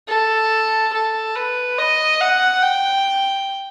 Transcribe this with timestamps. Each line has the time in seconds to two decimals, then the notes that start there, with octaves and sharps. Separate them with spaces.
0.08 A4
0.94 A4
1.35 B4
1.78 D#5
2.21 F#5
2.63 G5